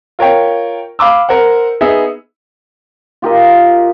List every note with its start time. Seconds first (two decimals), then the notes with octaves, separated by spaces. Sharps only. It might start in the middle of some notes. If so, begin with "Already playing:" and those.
0.19 F4 A#4 C#5 G5
0.99 F5 B5 D6 E6
1.29 A#4 C5 F#5
1.81 B3 D#4 G#4 E5
3.22 F4 G4 A#4 D#5